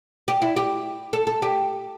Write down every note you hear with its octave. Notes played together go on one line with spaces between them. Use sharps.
G4
E4
G4
A4
A4
G4